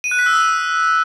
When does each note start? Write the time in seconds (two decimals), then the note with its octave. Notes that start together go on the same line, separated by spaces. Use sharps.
0.04 D#7
0.11 F#6
0.19 B6
0.26 E6
0.34 D#6